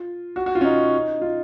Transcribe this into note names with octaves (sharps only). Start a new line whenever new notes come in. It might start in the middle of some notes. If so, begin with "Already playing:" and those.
Already playing: F4
F#4
F#4
F4
C#4
D#4
F4